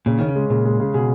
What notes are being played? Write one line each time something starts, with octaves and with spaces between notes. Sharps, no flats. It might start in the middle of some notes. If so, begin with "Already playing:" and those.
A#2 C#3
D#3 C#4
C#3
G#3
A#2 C#3
G#3
C#3
B2 G#4